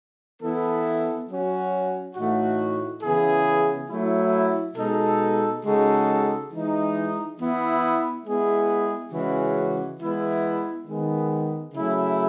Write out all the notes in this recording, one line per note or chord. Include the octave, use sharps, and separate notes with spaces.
E3 B3 E4 A4
F#3 C#4 F#4
A2 E3 A3 D#4 F#4
C#3 E3 B3 E4 G#4
F#3 A3 E4
B2 G#3 D#4 A4
C#3 G#3 D#4 F#4 A4
E3 G#3 D#4
E3 B3 E4
G#3 B3 E4 G#4
C#3 E3 G#3 C#4 F#4
E3 G#3 B3 E4
D#3 G#3 B3
C#3 F#3 A3 E4 G#4